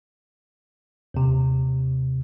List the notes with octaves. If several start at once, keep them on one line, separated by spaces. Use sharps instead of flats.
D#2 C3